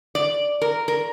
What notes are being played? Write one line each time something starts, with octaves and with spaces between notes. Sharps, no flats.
D5
A#4
A#4